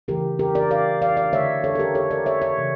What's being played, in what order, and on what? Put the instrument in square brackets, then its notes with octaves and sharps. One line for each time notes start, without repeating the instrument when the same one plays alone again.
[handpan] C#3 E3 A3 G4 A#4
G4 A#4
A#4 D5
D5 F5
D5 F5
D5 F5
D3 A3 C#5 E5
A4 C#5
A4
G4 A#4
A4 C#5
A#4 D5
C#5 E5
C#5 E5
C#3 E3 A#3